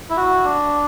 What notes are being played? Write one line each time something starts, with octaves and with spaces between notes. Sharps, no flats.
E4
F#4
D4